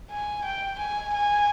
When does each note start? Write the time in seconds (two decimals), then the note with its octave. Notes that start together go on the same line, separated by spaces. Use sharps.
0.11 G#5
0.45 G5
0.79 G#5
1.14 G#5